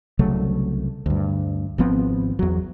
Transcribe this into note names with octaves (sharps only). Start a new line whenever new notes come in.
C2 C#3 F#3 A3
D2 G2
G#1 F3 B3 C4
E2 F#3